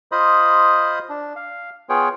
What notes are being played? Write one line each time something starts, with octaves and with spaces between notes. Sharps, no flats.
F4 C5 D#5 B5 D#6
D4
F5
B3 F4 G#4 C#5 G5